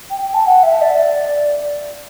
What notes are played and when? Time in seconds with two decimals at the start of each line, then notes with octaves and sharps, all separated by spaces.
0.10 G5
0.22 G5
0.34 A5
0.46 F#5
0.63 E5
0.82 D5